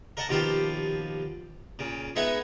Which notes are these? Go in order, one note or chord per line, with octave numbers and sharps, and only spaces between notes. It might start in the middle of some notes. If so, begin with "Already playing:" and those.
A#4 D#5 F#5 A5
D#2 B2 F3 F4 G4 A5
A#2 C#3
G#3 B3 D#4 E5 F#5 G#5